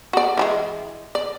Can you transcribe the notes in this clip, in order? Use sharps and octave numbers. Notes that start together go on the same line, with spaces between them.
F#4 D5
E3 G3 G#3
D5